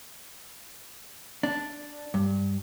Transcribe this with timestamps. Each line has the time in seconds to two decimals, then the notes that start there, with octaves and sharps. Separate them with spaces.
1.43 D4
2.14 G2